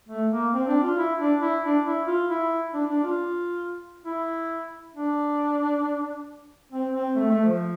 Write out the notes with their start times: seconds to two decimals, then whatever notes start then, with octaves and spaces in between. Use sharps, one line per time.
0.09 A3
0.31 A#3
0.54 C4
0.67 D4
0.83 F4
0.98 E4
1.19 D4
1.42 E4
1.64 D4
1.86 E4
2.07 F4
2.30 E4
2.74 D4
2.89 D4
3.03 F4
4.06 E4
4.95 D4
6.72 C4
6.93 C4
7.15 A3
7.31 A3
7.45 F3